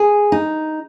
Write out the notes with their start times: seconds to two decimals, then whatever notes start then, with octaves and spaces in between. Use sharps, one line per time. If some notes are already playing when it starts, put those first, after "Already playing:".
Already playing: G#4
0.32 D#4